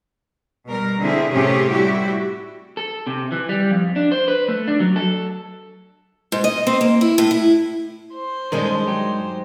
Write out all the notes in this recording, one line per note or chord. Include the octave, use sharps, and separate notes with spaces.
B2 G3 A#4
D3 C4 E4 G#4
A2 C3 A3 C#4 G4 G#4
G3 E4 F#4 G4
A4
C3
E3
G3
F2
D4
C5
B4
A3
D4
F#3
A4
G#2
D#5
C4
A#3
E4
A2
E4
C5
G2 D#3 G#3 C#4 A4 A#4
F#3 D#4 G4